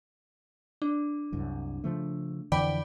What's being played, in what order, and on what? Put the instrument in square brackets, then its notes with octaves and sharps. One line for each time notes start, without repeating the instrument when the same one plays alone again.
[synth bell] D4
[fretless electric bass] C2 F#2
C#3 F3 A3
[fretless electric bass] F2 D3 E3 [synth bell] D5 G5 B5